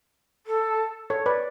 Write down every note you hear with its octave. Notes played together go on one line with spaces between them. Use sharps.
A4
A4 C#5
B4 D5